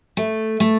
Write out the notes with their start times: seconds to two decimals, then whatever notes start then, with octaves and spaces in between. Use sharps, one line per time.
0.17 A3
0.60 A3